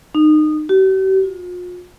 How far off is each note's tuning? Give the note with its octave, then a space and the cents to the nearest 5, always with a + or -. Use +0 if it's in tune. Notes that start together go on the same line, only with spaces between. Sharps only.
D#4 -25
G4 -45
F4 +40